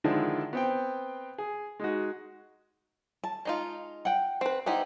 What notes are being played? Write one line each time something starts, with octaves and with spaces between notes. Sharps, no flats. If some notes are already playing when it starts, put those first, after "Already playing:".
D3 D#3 F3 G#3 D4 E4
B3 C4 G5
G#4
G#3 D#4 F#4
A5
G#3 D#4 F4
F#5 G5
C4 B4
B3 D#4 E4 G4 C5 F#5